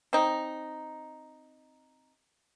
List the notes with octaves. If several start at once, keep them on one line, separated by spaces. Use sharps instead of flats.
C4 D#4